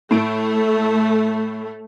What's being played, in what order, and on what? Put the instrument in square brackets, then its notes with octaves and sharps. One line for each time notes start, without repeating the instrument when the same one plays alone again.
[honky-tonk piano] A2 D7 [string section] A3